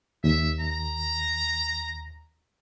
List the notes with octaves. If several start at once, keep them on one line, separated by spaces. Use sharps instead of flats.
D#2 E5
A#5